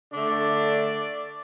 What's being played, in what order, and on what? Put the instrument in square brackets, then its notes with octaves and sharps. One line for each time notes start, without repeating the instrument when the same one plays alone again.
[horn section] D3 A3 D4 D5